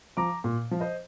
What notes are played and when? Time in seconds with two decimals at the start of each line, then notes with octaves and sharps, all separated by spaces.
0.17 F3 A#5 D6
0.44 A#2
0.71 F3
0.80 C5 D#5